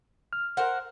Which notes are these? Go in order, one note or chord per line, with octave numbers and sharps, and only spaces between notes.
F6
A#4 C5 F#5